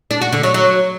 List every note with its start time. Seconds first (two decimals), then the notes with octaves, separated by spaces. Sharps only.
0.11 D4
0.22 F#4
0.32 D3
0.43 F#3
0.54 F#3